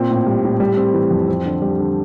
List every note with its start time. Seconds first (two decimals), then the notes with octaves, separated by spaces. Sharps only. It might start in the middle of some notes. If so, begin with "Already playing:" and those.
Already playing: A#2 C4
0.10 A2
0.27 G3
0.44 A2
0.60 G3
0.77 C4
0.94 E3
1.11 F2
1.28 C4
1.45 D3
1.62 G3
1.79 D3